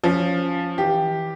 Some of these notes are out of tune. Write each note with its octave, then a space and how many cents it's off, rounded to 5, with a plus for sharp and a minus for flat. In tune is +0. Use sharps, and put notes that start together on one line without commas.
F3 +0 C#4 +10
E3 -30 G4 +0